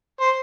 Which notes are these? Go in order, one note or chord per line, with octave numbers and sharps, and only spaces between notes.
C5